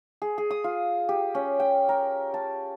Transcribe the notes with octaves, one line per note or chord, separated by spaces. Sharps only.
G#4
G#4
D#6
F4
G4
C#4
G5
A#4
A5